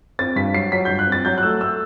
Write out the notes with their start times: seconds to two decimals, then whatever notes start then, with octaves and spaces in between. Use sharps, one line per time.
0.19 C4 A6
0.36 G2 B6
0.54 F#3 C7
0.72 F#3 B6
0.85 G6
0.90 G2
0.99 F#6
1.07 C4 A6
1.25 F#3 G6
1.38 F#6
1.43 A3 E6
1.61 A3 E6